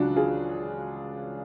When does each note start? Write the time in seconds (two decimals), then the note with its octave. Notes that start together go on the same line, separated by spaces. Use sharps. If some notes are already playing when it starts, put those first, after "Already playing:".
Already playing: C#2 C#3 F#3 D4 F4 F#4
0.16 F4 G#4